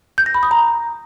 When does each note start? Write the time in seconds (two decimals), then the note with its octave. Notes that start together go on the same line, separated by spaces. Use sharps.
0.18 G6
0.26 A#6
0.34 B5
0.43 D#6
0.51 A#5